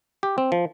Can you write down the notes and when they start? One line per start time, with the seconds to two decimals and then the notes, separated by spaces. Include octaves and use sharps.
0.23 G4
0.38 C4
0.52 F3